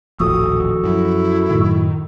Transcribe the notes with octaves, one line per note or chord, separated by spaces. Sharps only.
D#1 A1 F3 F#4 A4 D#6
F#2 E4
F#2 A2 D#3